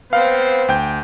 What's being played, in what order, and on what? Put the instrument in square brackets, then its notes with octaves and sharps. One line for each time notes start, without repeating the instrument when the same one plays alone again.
[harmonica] B3 C4 C5 [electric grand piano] F5
[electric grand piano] D2 G5 G6